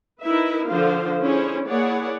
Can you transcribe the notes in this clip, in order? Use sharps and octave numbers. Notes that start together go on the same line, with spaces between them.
D#4 E4 A#4 B4 E5
D3 F3 C5 F5
C#4 D4 E4 G#4 C5 C#5
A#3 E4 G#4 C#5 D5 F#5